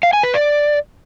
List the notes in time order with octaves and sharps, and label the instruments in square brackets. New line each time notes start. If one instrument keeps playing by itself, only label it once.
[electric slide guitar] F5
G#5
B4
D5